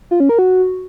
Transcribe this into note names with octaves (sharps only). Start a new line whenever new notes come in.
F4
C#4
A#4
F#4